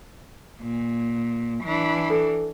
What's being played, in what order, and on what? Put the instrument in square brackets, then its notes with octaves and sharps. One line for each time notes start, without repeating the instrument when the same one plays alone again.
[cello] A#2
E3 D4
[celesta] A4